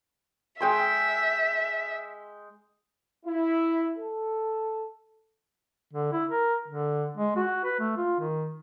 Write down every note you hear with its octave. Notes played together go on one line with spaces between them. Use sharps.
G#3 E5 G5 C6
E4
A4
D3
E4
A#4
D3
G#3
F#4
B4
A3
F4
D#3